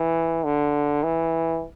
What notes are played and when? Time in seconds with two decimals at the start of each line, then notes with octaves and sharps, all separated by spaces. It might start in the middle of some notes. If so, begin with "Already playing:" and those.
Already playing: E3
0.44 D3
1.03 E3